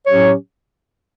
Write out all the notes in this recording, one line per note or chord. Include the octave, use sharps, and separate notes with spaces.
A2 F#3 C#4 G4 C#5